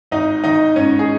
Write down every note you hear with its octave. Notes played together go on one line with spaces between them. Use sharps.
G#1 D#4 D#5
D#3 D#4 D#5
G#2 C#4 C#5
G#4